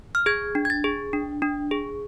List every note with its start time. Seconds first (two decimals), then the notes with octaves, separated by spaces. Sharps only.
0.15 F6
0.26 G#4 G#6
0.55 D4
0.65 G#6
0.70 A6
0.84 G#4
1.13 D4
1.42 D4
1.71 G#4